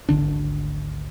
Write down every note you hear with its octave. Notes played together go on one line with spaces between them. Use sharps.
G#1 D2 D3 D4